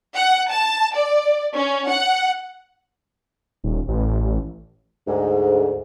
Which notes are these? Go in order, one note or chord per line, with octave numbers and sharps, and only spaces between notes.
F#5
A5
D5
C#4
F#5
D#1
A1
D2 G#2